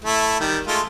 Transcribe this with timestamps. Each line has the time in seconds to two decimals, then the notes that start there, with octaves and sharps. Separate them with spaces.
0.04 A3 E4
0.40 D#3 G3
0.67 G#3 A3 F4